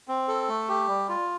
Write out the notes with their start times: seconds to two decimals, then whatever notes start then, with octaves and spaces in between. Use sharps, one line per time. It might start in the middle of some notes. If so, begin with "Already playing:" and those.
0.08 C4
0.28 A4
0.48 A3
0.68 G4
0.88 G3
1.09 F4